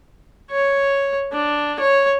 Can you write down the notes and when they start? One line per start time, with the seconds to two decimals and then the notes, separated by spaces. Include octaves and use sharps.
0.51 C#5
1.32 D4
1.80 C#5